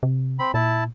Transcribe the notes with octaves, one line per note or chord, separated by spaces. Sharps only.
C3
C4 B5
A#2 E4 A5